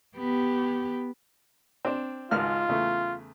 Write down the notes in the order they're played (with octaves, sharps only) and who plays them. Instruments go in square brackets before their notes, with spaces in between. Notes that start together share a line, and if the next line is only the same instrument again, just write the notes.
[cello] B3 G4
[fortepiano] C4 D4
[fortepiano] G#1 C#2 F6 [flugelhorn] F4
[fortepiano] E2 C#3 A3